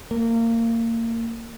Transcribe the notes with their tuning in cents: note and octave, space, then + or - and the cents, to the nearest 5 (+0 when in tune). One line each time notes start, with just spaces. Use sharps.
A#3 -25